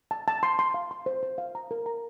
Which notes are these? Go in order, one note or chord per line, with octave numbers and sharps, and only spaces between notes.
A5
A5
C6
C6
F5
C6
C5
C5
F5
A#5
A#4
A#5